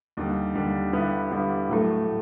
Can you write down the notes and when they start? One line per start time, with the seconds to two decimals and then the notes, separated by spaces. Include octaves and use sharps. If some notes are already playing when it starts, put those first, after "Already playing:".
0.17 D#2 D3 G3
0.55 D#2 D3 G3
0.93 G2 D3 G3 B3 E4
1.31 G2 D3 G3 B3 E4
1.69 A2 F#3 A3
2.06 A2